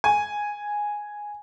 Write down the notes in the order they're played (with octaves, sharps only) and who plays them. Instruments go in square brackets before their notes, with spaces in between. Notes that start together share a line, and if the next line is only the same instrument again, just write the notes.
[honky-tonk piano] G#5